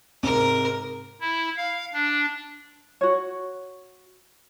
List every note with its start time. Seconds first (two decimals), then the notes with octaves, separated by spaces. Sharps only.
0.23 G#2 C3 A#4
1.21 E4
1.57 F5
1.93 D4
3.01 F#4 C#5